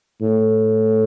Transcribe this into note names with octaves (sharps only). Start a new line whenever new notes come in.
A2